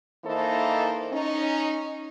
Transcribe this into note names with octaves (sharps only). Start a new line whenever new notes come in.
E3 A#3 D#4 A4 C5
C#4 D#4